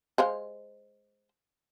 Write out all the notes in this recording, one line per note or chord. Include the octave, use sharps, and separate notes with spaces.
G#3 C5 F5